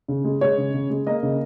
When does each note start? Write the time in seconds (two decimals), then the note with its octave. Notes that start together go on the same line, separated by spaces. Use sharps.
0.08 C#3
0.25 G#3
0.41 G#3 C#5
0.58 C#3
0.74 C#3
0.90 G#3
1.07 A#3 D#5
1.23 C#3